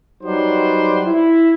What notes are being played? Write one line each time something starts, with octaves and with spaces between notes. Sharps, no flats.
F#3 G3 D#4 B4 C5 D5
E4